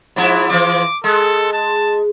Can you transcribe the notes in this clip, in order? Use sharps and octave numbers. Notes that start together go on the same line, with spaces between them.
G#2 F3 E4
E3 F3 D6
G#3 A4
A5